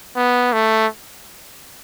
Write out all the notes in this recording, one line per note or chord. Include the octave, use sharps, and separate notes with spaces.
B3
A3